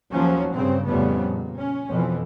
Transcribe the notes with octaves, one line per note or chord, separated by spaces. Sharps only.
D#2 F3 F#3 C#4
G2 C#3 C4
F2 A2 C#3 G3 B3
A#2
C#4
F2 B2 E3